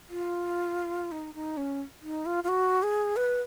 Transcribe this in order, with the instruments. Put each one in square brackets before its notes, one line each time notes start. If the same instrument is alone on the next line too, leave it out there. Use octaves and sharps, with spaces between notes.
[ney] F4
D#4
D#4
C#4
D#4
F4
F4
F#4
G#4
B4